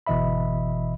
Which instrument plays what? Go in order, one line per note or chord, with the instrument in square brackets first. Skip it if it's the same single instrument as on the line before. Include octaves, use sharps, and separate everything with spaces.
[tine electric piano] G1 B2 E3 D#5 E5 B5